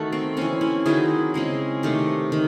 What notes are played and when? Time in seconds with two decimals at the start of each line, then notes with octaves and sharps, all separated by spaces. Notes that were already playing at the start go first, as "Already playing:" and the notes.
Already playing: D#3 A3 F#4 A4
0.12 C4
0.37 E3 C4 C#4
0.61 C#4 E4
0.86 D#3 F#3 C4 E4 G#4
1.34 C#3 G#3 C4
1.83 C3 D#3 A3
2.32 D#3